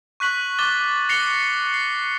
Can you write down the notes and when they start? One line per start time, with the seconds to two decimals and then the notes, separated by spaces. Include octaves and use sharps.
0.20 C#6 F#6 B6 F#7
0.59 D6 A6 G7
1.09 A#6 C7 C#7 F7 G7
1.74 C7